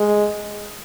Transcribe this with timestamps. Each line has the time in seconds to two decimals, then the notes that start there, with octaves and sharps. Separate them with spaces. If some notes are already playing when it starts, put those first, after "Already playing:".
Already playing: G#3